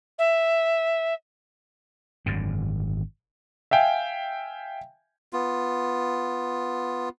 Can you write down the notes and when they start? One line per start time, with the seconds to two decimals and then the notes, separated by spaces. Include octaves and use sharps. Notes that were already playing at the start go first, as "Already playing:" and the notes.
0.18 E5
2.26 G#1 F#2 D3
3.71 E5 F5 G5 G#5
5.33 B3 F4